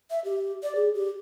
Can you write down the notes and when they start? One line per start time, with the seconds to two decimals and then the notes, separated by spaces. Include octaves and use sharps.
0.11 E5
0.25 G4
0.63 D5
0.76 G#4
0.95 G4